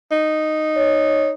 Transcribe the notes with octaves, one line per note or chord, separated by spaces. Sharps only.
D#4
C#5